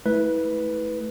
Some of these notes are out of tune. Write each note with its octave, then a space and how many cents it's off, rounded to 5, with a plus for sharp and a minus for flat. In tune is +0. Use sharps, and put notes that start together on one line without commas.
A3 -15 E4 -30 B4 +0